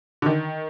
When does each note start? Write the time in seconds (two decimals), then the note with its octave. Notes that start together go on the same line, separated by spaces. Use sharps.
0.22 D3
0.26 D#3